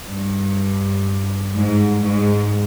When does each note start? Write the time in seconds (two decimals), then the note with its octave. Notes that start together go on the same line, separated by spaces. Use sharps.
0.10 G2
1.55 G#2
2.03 G#2